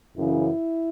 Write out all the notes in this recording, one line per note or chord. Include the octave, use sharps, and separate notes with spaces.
F#2 C#3 E3 E4